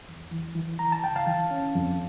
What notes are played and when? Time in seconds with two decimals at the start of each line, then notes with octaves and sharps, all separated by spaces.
0.09 E2
0.31 E3
0.55 E3
0.79 E3 A#5
0.92 A5
1.04 C#2 G5
1.16 F5 A5
1.27 E3
1.51 C#4
1.75 F2